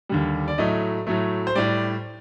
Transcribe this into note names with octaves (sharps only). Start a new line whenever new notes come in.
D#2 D3 G3
D5
A2 F#3 A3 D#5
A2 F#3 A3
C5
A2 G3 D5